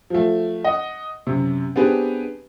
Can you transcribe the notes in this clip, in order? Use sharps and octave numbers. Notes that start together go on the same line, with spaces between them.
F3 A3
D#5 F#5
F#2 C3
B3 C4 D4 G4 G#4 B4